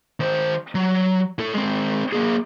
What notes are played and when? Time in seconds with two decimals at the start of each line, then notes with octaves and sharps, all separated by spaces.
0.20 D#3 C5
0.75 F#3
1.39 A2 A4
1.54 G#3 C4
2.13 A#3 G#4